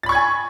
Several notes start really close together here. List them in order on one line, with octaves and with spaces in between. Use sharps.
A6 B5 C#6 G#6 G#5